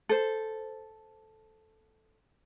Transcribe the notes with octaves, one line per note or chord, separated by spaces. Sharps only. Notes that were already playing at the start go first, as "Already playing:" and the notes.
A4 C5